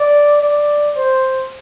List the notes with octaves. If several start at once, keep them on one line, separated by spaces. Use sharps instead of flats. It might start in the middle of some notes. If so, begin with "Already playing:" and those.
Already playing: D5
D5
C5